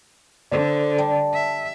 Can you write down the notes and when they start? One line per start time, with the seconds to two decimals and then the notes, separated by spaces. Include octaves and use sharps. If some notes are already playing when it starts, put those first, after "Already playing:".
0.52 D3 A4 C5 D5
0.98 G3 A5
1.34 E5